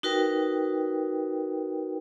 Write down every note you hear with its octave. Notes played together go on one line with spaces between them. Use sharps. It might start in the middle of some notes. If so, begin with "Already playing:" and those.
D#4 F#4 A#4 B4 G5